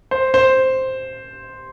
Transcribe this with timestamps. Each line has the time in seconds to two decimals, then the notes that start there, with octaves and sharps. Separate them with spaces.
0.11 C5
0.34 C5